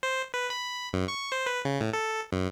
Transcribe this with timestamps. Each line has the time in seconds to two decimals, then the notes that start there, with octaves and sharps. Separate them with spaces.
0.03 C5
0.34 B4
0.50 B5
0.93 F#2
1.08 C#6
1.32 C5
1.46 B4
1.65 C#3
1.80 A2
1.93 A4
2.32 F#2